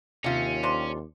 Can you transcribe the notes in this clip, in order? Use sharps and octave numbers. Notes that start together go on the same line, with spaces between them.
D#2 C3 C#4 F4
C4 D4 C6